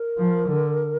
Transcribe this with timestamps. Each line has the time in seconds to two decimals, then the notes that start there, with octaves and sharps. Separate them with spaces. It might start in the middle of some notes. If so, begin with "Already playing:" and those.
Already playing: A#4
0.18 F3
0.48 D3